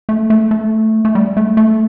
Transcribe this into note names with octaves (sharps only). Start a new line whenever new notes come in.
A3
A3
A3
A3
G3
A3
A3